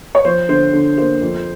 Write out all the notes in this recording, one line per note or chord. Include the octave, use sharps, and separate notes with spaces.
C#5
F3 C5
D3 C5
D3
A#3 C5
F2